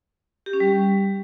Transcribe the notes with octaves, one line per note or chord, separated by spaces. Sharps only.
G4
C#4
G3